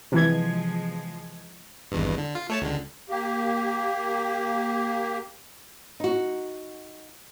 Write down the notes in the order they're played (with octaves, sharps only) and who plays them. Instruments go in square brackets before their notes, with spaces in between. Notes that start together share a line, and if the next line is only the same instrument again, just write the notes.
[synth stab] C3 E3 G#6 [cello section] F3 G#3
[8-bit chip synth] G#1 E2 G2
D3
F4
A3 C#5 A5
C#2 D3
[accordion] A#3 G4
[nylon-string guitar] D#4 F#4